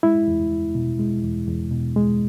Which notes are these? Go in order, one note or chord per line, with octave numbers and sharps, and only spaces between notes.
G#3 E4
E2
E2
B2
G#3
E2
E2
B2
G#3